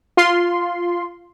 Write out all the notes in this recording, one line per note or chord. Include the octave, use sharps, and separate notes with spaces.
F4 C6